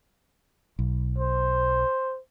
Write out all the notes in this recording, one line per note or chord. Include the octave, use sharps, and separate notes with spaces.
B1
C5